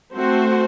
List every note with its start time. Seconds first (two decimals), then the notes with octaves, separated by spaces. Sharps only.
0.14 A3 C4 F#4 C5